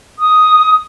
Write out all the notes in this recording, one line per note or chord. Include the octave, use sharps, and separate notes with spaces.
D#6